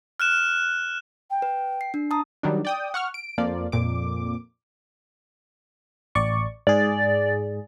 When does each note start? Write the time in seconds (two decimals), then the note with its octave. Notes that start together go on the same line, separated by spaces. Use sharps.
0.20 F6 F#6 E7
1.30 G5
1.42 B4
1.81 C7
1.94 D4
2.11 A5 A#5 D#6
2.43 D#3 F#3 G3 D4
2.65 D5 G5 D#6
2.94 F#5 C#6 F6
3.14 D7
3.38 F2 F3 A#3 F4 D5
3.72 F2 A#2 D6
6.15 A1 D5 C#6
6.67 G#2 G#4 D5